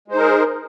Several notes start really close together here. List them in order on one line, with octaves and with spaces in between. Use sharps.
G#3 C5 D#4 A#4 G#4